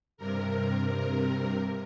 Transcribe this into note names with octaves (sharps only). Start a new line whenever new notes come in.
G2 C3 A#4